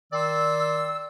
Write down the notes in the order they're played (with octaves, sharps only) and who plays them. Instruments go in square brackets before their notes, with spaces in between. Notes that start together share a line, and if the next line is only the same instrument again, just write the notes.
[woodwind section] D#3 D5 C6 E6